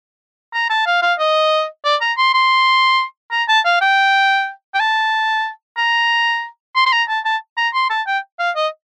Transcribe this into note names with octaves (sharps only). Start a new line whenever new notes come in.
A#5
A5
F5
F5
D#5
D5
A#5
C6
C6
A#5
A5
F5
G5
G5
A5
A#5
C6
C6
A#5
A5
A5
A#5
C6
A5
G5
F5
D#5